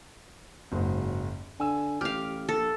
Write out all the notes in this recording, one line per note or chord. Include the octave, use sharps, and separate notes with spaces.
F#1 G#2 F#3
D3 G#5 E6
A1 G4 F5 F6
A#1 A4